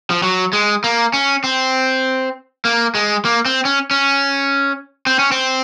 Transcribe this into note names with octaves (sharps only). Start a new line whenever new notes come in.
F3
F#3
G#3
A#3
C#4
C4
A#3
G#3
A#3
C4
C#4
C#4
C4
C#4
C4